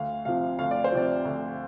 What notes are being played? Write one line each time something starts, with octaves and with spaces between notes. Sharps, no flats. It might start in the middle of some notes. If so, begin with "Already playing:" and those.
Already playing: D2 F5
C3 F3 F5
D2 F5
D5
C5
C3 F3 D5
D2